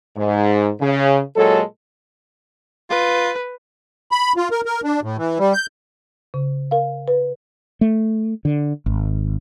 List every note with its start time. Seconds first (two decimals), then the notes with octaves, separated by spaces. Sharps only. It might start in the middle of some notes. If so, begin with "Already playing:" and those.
0.16 G#2
0.81 C#3
1.36 A#2 F#3 G#3 A4
2.90 F4 B4
4.11 B5
4.37 F4
4.51 A#4
4.65 A#4
4.84 D4
5.03 A2
5.17 E3
5.39 G3
5.53 G6
6.34 C#3
6.71 A#4 F5
7.08 B4
7.81 A3
8.45 D3
8.86 G#1